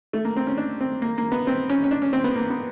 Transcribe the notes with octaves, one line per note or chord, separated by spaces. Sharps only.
A3
A#3
C4
C#4
D4
C4
A#3
A#3
B3
C4
C#4
C#4
D4
C#4
C4
B3
A#3
B3